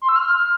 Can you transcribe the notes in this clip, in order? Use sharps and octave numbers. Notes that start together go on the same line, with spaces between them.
C6
E6
F6